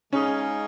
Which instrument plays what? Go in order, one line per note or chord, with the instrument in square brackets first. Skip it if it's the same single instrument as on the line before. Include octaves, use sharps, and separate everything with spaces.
[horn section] C#3 G#3 D#4 G#4 [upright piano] C#4